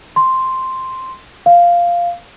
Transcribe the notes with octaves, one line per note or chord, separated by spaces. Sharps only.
C6
F5